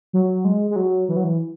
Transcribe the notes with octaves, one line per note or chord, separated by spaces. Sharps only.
F#3
G#3
G#3
F#3
E3
F#3
E3